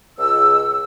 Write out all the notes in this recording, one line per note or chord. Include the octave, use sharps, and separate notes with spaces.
C#2 E6